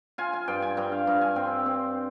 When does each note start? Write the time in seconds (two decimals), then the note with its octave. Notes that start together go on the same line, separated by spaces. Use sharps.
0.18 F4 G#5
0.33 G#5
0.48 G2 G5
0.62 G#5
0.77 G2 G5
0.92 F5
1.07 G2
1.21 G#5
1.36 C4 G5
1.66 C4